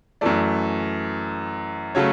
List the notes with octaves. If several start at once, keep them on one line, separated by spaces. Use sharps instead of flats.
F#2 E3 A3 D5
C#3 F#3 A3 C#5